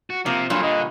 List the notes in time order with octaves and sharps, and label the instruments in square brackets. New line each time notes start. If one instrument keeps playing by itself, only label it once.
[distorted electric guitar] F#4
[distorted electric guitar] C3 [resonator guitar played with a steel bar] F3 [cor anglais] A#3
[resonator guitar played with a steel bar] G2 A#2 [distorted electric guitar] F#3 A4 [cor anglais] F4
[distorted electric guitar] D3 [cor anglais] D#5